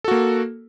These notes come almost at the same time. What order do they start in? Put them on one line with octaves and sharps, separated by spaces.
A4 F#4 A#3